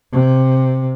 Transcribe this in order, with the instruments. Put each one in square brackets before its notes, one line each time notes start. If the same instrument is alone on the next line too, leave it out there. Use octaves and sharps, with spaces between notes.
[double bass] C3